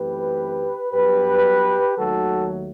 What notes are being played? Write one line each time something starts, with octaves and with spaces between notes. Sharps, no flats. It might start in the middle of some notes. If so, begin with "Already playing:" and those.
Already playing: F#2 E3 A3 C4 G4 B4
G2 F#3 B3 G4 B4
D#2 D#3 F#3 A3 F#4 A4